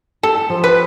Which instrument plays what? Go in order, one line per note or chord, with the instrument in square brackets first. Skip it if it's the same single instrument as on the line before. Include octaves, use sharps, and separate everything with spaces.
[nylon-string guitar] G4 [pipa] A4
[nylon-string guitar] F3
[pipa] B4